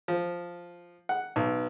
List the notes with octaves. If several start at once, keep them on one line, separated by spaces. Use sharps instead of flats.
F3
F#5
B1